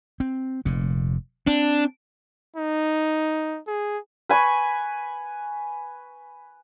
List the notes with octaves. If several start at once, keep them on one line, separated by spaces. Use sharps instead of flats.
C4
F1 A#2
C4 D4
D#4
G#4
B4 G#5 B5 C#6